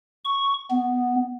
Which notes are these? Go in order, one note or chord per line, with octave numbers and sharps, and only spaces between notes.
C#6
B3